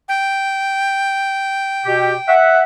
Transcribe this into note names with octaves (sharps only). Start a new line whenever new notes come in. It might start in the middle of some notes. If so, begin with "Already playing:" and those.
G5
B2 G4
E5 F#5